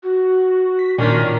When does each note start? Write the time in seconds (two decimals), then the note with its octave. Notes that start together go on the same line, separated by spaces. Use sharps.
0.03 F#4
0.79 B6
0.98 A#2 D#3 C#4 D4 A#4